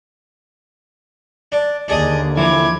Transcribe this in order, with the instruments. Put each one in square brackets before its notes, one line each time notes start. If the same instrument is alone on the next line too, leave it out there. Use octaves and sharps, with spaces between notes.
[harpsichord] D4
[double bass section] D#2 D3 [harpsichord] D4 G#4 D#5
[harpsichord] E3 [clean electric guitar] F3 E4 [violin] D6 G#6